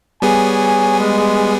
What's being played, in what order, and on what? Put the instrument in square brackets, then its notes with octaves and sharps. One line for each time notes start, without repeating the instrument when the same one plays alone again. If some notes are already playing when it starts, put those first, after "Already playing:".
[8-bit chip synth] G3 B3 G#4 [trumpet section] C#5 G#5
[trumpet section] G#3